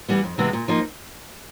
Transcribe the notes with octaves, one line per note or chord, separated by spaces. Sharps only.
E3 G3 B3
F2
C3 E3 G#3 B3
A#2
F3 A#3 D#4